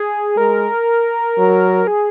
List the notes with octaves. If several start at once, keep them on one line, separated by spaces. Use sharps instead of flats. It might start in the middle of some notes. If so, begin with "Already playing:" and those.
Already playing: G#4
G#3 A#4
F#3
G#4